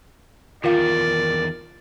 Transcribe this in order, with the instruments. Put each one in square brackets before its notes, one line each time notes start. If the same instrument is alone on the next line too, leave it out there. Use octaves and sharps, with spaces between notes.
[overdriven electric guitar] E2 D#3 [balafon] F4 F5 [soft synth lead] A#4 [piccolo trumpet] D5